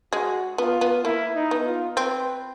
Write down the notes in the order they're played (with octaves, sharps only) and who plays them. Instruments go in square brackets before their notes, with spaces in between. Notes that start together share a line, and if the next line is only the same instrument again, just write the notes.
[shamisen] G#3 [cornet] F#4
[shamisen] B3 [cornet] F4
[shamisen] B3
[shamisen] A#3 [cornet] E4
[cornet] D#4
[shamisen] B3
[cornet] F4
[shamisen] C4 [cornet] B4